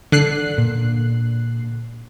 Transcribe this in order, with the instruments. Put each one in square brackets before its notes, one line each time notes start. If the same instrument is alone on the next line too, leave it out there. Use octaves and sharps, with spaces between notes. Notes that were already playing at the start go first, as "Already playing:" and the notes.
[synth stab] D3 F#6 C7
[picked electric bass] A#2